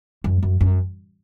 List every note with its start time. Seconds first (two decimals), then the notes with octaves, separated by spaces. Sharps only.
0.24 F#2
0.43 F#2
0.61 F#2